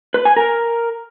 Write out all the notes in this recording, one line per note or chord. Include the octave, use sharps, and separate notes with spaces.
B4
G#5
A#4